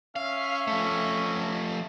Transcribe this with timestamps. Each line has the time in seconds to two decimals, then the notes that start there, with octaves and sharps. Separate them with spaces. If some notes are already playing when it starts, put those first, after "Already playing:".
0.16 C#4 E5 F5
0.68 F3 A3